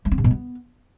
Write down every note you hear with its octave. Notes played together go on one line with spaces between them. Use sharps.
A3
C4
C3
B2
B3